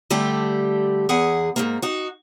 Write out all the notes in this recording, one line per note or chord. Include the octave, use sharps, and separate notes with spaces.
D3 G3 A3 G4
E2 G#4 F#5
G#2 C#3 A#3
D#4 F#4